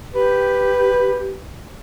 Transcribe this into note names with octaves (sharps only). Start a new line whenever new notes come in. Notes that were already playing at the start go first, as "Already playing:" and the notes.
G4 B4